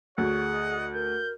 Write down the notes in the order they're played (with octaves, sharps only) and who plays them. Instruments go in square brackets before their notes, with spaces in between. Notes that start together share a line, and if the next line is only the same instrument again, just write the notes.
[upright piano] D2 [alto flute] G#4 [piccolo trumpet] C#5 [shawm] F#5
[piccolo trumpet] D#5
[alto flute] A#4 [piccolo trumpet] G6